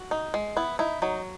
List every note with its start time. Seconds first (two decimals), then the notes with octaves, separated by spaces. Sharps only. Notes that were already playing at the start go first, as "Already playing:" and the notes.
Already playing: F#4
0.11 D#4
0.34 G#3
0.57 B3 E4
0.79 D#4 E4
1.02 F#3 D#4